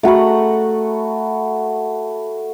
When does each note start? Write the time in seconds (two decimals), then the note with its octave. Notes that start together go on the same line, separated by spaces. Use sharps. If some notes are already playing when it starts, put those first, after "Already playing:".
0.03 A3 F#4 A#5 B5